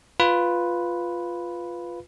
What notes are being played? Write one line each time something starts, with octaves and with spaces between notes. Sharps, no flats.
F4 B4